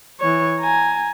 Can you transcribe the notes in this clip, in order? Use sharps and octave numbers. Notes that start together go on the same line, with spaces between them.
E3 C#5
G#5 A#5